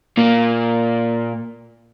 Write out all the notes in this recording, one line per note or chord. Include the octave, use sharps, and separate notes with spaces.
A#2 A#3